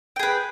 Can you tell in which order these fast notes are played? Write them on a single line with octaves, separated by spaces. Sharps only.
G5 G#4 B4